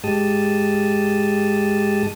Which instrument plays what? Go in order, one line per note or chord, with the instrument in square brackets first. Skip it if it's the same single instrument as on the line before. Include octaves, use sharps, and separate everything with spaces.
[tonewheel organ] G#2 G#3 G4 A5 D#6